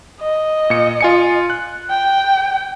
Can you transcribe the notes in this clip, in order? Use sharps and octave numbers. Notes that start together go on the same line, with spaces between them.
D#5
A#2 C#7
F4 G#5 C#7
F#6
G5